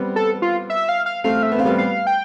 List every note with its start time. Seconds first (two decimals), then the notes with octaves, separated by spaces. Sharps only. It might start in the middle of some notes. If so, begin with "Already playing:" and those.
Already playing: G3 B3 C4
0.16 A4
0.42 F4
0.70 E5
0.89 F5
1.06 F5
1.24 A3 C4 F5
1.43 E5
1.52 B3
1.59 C4 F5
1.65 G3 B3
1.78 F5
2.07 G5